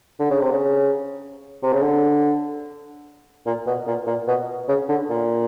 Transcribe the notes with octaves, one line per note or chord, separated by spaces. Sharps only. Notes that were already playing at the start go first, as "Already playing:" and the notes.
D3
C#3
C3
C#3
C3
C#3
D3
A#2
B2
A#2
A#2
B2
C#3
D3
A#2